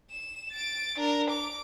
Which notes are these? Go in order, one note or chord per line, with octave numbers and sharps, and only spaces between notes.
E7
A6 D7
D4 A#4
D6